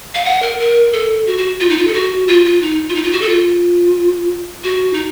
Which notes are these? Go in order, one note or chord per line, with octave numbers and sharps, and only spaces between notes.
F5
F#5
A#4
A#4
A4
F#4
F#4
F4
D#4
F4
A4
F#4
F4
F4
D#4
F4
D#4
F4
F#4
A4
F4
F#4
D#4